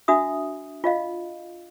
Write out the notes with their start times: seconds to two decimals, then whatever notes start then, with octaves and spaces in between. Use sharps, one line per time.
0.08 D4 F#4 E5 D#6
0.84 F4 D#5 F5